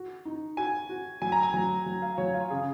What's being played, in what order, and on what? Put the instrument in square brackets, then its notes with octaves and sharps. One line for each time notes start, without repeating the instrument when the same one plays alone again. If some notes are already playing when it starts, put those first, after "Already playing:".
Already playing: [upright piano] F#4
D#4
[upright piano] F#4 [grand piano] G#5
[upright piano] F#4
[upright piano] F#3 [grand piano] G#5
[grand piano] A#5
G#5
[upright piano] F#3
F#3
[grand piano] F5
[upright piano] F#3 [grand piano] C#5
[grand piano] F4
[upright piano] C#3 [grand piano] G#4